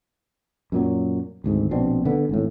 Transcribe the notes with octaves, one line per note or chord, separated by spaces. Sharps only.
F#2 A#2 F#3
G#1 D2 G#2
A#1 B2 C4 D4
D3 B3
G#1 E2 A2